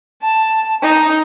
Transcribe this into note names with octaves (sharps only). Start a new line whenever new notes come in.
A5
D#4